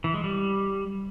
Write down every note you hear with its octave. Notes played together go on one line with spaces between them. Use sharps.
E3
G#3
G3